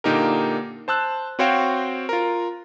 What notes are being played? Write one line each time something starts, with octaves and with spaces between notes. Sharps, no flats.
A#2 D3 A#3 D#4 G4 A#4
C5 A5 E6 F#6
C4 F#4 C5 C#5 F5 G5
F4 A#4